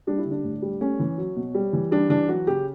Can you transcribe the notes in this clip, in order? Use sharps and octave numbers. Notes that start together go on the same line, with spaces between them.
G3 D4
E4
D3
D4
A2
G3
A3 C#4
E3
F#3
B2
G3
E3
G3 D4
E3 D4
F#3 F#4
C#3 G4